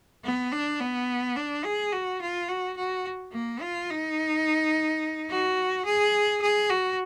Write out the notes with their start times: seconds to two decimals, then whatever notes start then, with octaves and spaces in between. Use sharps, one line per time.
0.24 B3
0.52 D4
0.80 B3
1.36 D4
1.65 G#4
1.92 F#4
2.21 F4
2.49 F#4
2.77 F#4
3.33 A#3
3.61 F4
3.90 D#4
5.30 F#4
5.85 G#4
6.42 G#4
6.70 F#4